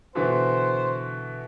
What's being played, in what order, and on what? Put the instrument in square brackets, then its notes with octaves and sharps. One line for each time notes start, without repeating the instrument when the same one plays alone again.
[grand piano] B2 D3 E3 [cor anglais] C5